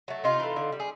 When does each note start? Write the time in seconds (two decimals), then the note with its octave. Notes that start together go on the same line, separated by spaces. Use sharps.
0.08 F#3 A3
0.24 C3 D#4 F4
0.40 E3 A3
0.56 D3
0.72 G3
0.80 G#4